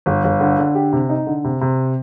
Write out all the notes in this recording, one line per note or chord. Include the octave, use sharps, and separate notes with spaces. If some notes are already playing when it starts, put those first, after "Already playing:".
G1
G1
D3
D3
G4
C3
D#4
D3
C3
C3